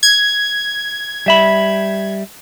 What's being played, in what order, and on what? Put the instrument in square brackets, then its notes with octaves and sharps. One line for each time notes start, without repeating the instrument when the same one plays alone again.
[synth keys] G#6
[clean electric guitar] G3 E5 B5